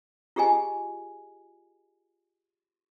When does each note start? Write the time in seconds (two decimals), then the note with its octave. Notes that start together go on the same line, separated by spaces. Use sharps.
0.36 F4 G4 G#4 D#5 G#5